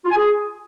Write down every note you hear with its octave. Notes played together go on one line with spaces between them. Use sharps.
F4
G#5
G#4